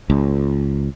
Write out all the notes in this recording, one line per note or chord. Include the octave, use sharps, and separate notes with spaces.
C#2